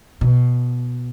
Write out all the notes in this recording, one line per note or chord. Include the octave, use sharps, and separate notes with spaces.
B2